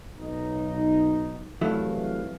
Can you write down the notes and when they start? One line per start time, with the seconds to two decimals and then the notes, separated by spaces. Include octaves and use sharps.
0.19 B1 D#4
1.61 C2 E3 F#3 A3 E4 F5